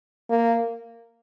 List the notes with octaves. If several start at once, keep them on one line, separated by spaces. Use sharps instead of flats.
A#3